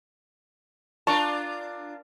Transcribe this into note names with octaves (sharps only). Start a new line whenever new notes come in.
D4 F4 A#4 A5 C#6